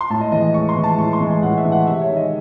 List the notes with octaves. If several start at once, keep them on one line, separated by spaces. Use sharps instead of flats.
C6
A2 A5
D#5
E3 G#3 D#5
D#5
A2 C#6
C6
E3 G#3
A5
A2 C#6
C6
E3 G#3
G#5
A2 F#5
E5
E3 G#3
F#5
C3 E5
C#5
D#3 G#3
D#5